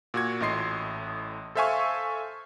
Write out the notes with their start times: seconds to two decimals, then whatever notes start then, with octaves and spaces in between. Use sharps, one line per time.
0.14 A#2 F#4 G#6
0.40 A1 A2 D#5 C6 C7
1.55 A4 C5 E5 F5 G#5 C#6